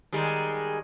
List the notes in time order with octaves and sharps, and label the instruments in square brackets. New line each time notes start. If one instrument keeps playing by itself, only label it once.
[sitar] D#3 G3 G#3